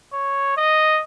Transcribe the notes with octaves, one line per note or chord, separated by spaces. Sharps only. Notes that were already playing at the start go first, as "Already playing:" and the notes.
C#5
D#5